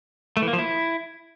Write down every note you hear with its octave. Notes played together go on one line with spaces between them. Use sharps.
A3
E3
A#3
F3
E4